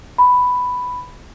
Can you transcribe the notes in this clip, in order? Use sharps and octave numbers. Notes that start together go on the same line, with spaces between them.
B5